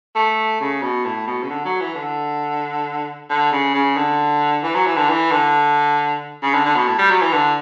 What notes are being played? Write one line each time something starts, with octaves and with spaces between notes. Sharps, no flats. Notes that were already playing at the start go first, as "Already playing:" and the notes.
A3
C#3
B2
A2
B2
C#3
D3
F#3
E3
D3
D3
C#3
C#3
D3
E3
F#3
E3
D3
E3
D3
C#3
D3
D3
B2
A2
G3
F#3
E3
D3